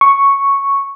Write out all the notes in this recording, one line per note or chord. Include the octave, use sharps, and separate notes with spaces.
C#6